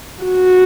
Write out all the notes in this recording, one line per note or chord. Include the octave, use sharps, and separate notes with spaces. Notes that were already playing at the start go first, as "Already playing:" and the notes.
F#4